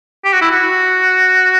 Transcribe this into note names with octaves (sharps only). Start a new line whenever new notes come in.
G4
F#4
E4
F#4